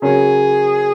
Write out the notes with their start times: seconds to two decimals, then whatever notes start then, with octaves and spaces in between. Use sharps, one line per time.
0.02 C#3 F#3 C#4 G#4 A#4 C#5